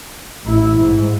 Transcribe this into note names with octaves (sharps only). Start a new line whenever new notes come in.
A1 E4
G#2